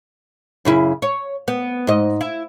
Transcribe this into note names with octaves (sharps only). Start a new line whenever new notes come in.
F#2 C#3 E4
C#5
B3
G#2 D#5
E4